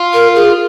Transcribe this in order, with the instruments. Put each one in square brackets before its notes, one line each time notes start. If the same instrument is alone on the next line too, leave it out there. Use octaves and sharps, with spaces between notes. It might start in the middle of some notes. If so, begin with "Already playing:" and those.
Already playing: [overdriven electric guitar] F4
[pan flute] A#4
G#4